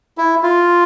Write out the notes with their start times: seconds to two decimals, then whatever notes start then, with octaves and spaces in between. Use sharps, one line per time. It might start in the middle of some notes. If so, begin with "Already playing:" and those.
0.18 E4
0.43 F4